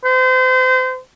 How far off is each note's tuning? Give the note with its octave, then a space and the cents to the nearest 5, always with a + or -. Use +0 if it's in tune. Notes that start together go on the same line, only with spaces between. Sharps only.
C5 -35